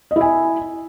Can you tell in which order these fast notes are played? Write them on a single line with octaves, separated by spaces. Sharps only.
D#5 E4 G#5